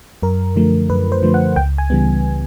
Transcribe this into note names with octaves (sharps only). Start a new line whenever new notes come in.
F#2 A#4
D3 F3 A3
F#2 B4
C5
D3 F3 A3
F#5
C#2 G5
G#5
C#3 E3 G3 B3